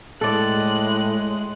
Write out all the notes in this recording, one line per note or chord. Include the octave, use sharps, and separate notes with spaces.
A2 G#3 A4 D5 F#6